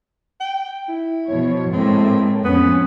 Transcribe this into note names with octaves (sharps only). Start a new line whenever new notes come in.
G5
E4
B2 F3 C#5
A2 G#3 A#3 C4
F2 F3 B3 C#4